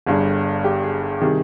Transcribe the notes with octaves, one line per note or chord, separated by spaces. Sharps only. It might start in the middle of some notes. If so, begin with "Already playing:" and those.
G1 G2 D3 G#4
G4
G#4
G#4
C3 D#3 G3 G#4